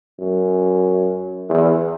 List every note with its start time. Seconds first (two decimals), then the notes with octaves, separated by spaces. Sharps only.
0.20 F#2
1.49 E2